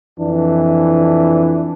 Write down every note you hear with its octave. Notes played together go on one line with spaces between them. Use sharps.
F2 E3 D4